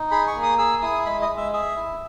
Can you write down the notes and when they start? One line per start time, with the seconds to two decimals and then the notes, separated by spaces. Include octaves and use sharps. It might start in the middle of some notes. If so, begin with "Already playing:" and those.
Already playing: D#4
0.11 G#4 B5
0.27 C#6
0.35 A#3
0.43 D#6
0.58 G#4 E6
0.82 E4 D#6
1.06 G#3 B5
1.21 D#5
1.29 G#3
1.37 E5
1.53 G#4 E5
1.76 E4